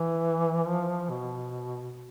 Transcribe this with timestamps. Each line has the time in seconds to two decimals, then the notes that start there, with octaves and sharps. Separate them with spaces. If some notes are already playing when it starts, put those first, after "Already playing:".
Already playing: E3
0.65 F3
1.10 B2